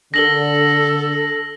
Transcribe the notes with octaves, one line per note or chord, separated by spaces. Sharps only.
D3 A4 A#6 F#7 G7